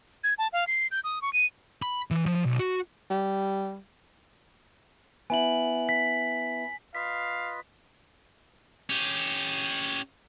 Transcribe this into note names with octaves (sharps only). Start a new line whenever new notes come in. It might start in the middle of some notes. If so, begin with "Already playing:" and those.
G#6
A5
F5
C7
G6
D#6
C#6
D#7
B5
E3
F3
B1
F#4
G3
B3 E4 G#5 F#7
B6
F4 B4 D#5 F5 B6
C#4 G4